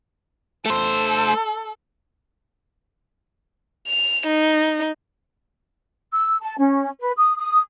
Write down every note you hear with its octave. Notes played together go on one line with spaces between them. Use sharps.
A3 A4 C5
F7
D#4
E6
A5
C#4
B4
D#6
D#6